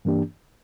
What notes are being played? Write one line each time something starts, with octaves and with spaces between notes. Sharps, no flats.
G2 E3 A#3 D4 G4